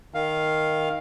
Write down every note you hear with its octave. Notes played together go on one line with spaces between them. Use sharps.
D#3 F5